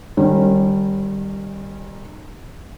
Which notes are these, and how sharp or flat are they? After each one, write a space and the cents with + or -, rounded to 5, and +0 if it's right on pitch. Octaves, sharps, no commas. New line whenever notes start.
D#3 -30 G3 +0 C#4 -35